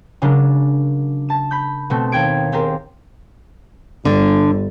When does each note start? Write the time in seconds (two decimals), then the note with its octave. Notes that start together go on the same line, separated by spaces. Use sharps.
0.22 C#3 F#3 G#3 D4 A#4
1.29 A5 E7
1.51 B5 G6
1.90 B2 A3 C4 A4
2.12 D#2 G5 G#6 D7
2.52 C4 G4 G#4 A#4 C5
4.05 G1 D3